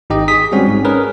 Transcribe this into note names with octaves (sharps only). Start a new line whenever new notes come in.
G#1 D#4 G4 D#5
G#4 D#6 B6
G3 G#3 C4 C#4 F#4
G#2
C#4 G#4 A#4 B4